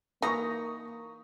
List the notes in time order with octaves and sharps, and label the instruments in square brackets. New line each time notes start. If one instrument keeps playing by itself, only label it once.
[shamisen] E3 [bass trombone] A#3 [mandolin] D#4 A#5 [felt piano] C#6 D#6